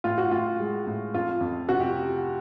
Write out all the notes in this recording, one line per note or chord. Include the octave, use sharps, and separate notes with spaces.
A2 F4
F#4
A2 F4
G#3
A2
F2 F4
F2
C3 F#4
G4